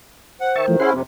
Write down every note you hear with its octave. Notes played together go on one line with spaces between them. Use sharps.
C5 F#5
D#3 E5 A5 C#6
E3 F3 A3
C#4 E4 G#4 F#5 C6
F2 C3 C4